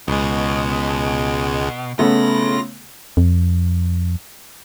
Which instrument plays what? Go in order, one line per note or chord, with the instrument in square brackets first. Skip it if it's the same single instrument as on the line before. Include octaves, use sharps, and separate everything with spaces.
[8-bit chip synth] C#2 G#3 [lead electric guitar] B2
[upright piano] C#3 A3 B3 [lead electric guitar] F4 B5 [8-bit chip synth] A#6
[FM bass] F2